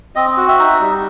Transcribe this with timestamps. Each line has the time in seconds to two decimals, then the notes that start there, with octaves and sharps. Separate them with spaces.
0.15 C4 D#5
0.37 F#4
0.48 E5
0.59 D#4
0.81 G3